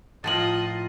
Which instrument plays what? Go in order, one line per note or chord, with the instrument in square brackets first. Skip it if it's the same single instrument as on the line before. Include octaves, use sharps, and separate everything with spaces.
[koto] A2 F3 A#4 [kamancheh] F4 D#5 [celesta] A6 F#7